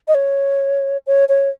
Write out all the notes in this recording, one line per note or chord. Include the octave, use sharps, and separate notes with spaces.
D#5
C#5
C#5
C#5